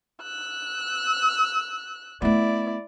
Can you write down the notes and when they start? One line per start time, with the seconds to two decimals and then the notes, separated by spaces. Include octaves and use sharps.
0.23 E6 F#6
2.22 A3 B3 E4 D5